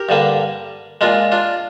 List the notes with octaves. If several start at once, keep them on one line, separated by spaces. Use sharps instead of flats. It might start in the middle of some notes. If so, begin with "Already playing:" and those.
Already playing: G4 A#4
G2 D3 G3 A#3
A#2 G#3 D4 F4
D4 F4